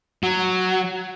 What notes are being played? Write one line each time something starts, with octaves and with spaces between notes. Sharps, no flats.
F#3